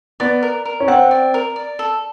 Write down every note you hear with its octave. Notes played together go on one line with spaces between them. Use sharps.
B3 D5
A#4
A#4
C#4
C4 F#5
D5
A#4
D5
A4